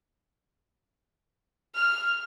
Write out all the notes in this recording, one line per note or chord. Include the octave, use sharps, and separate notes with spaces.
F6